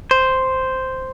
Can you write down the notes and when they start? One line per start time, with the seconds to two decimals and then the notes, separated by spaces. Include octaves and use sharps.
0.11 C5